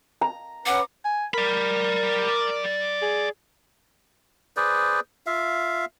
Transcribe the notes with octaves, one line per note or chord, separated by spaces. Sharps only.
A#5
C#4 B4 F#5 D6
G#5
A#4 D5 B5
G#4
G#4 B4 C5 D5
F4 E5 F5